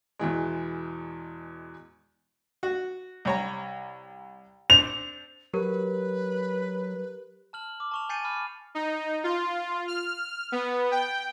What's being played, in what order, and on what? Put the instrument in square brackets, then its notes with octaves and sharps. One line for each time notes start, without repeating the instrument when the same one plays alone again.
[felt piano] E2 B2 E3 G#3
[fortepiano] F#4
C2 C#5 A#5
[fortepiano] C4 D4 [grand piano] F7
[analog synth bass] F#3 [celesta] G4 A#4 [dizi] B4
[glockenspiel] A5 F6 F#7
D6
A5 C#6 F7
G#5 G6 A6 C7 C#7 D#7
B5 D6 F6
[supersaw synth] D#4
F4
F6
B3
G5